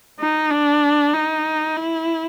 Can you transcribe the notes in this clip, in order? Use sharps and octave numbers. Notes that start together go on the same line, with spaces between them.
D#4
D4
D#4
E4